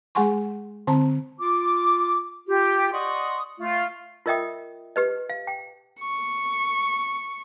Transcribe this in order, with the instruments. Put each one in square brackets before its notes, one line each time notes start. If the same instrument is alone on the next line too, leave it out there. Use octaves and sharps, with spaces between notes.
[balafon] G#3 G#4 F#5 G#5 C6 C#6
D3 C4 A5 A#5
[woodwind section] F4 D6
F4 G4
D5 D#5 F#5 C6 C#6 D#6
A3 F4
[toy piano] F4 A#4 D#5 E5 G5 D#6
G4 B4 D#5
F5
G5
[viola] C#6